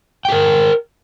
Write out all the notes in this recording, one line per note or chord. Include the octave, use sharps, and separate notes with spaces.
G#4 A#4 G5